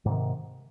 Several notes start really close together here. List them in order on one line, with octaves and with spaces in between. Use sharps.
G#2 C3 D#3